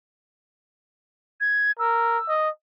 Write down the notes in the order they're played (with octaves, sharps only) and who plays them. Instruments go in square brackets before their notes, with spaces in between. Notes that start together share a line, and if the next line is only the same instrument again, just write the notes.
[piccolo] G#6
[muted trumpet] A#4 [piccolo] E6
[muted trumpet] D#5